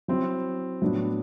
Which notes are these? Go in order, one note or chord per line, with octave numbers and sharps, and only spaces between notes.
F#3 C4 E4
A2 F#3 B3 D4